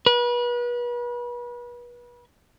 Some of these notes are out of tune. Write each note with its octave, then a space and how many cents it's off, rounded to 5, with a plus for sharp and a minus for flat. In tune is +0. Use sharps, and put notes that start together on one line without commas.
B4 -35